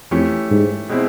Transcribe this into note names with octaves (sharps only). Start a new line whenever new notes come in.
F2 E3 A3 C#4 E4 G4
G#2
B2 G#3 C4 E4